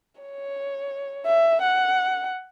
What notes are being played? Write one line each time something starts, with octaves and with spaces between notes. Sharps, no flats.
C#5
E5
F#5